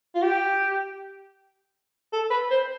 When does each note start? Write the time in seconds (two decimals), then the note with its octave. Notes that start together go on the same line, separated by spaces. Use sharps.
0.15 F4
0.22 G4
2.13 A4
2.30 B4
2.50 C5